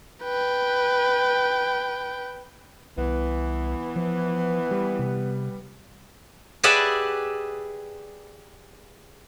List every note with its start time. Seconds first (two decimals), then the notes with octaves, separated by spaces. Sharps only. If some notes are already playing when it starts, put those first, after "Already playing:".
0.24 B4 G5
2.98 C2 E3 B3
3.96 F3
4.71 G3 B4
4.99 C3
6.63 G4 G#4 B4 D5 E5 F#5